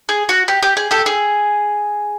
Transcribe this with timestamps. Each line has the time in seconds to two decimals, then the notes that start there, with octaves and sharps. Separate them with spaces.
0.09 G#4
0.29 F#4
0.48 G4
0.63 G4
0.77 G#4
0.91 G4 A4
1.06 G#4